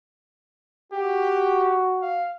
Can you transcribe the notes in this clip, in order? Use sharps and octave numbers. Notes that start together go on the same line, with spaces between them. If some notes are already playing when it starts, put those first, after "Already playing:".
F#4 G4
F5